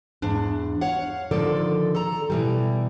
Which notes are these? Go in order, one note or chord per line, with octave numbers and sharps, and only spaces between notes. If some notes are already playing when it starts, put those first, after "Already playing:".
E2 G#2 D4
C#5 F5 F#5
D3 D#3 F3 A4 D5
A4 A#5
B2 E3 G3